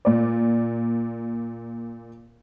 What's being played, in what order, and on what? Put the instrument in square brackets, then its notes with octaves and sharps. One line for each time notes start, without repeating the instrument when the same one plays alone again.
[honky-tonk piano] A#2 D5